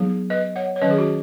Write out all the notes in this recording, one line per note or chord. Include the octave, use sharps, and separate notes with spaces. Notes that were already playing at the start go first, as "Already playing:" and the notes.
Already playing: F#3 B3 D#4 G#4
B4 D#5
C#5 F#5
C#5
D#3 F#3 C#4 B4 D#5
G#4
F#4